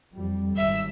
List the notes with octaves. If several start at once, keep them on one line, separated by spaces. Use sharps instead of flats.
F2 G3
G#1 E5 E6